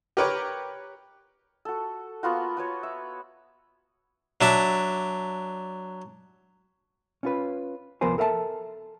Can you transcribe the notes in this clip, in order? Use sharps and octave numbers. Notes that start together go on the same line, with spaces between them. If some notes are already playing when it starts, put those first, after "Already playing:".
G4 A#4 B4 C#5 G5 D6
F#4 A4
A#3 B3 F4 F#4
F#4 B4 C#5
E5
F#3 D4 E5
C#4 F4 B4
C2 F3 B3 A#4 C5 G#5
A4 A#4 E5 F5 A5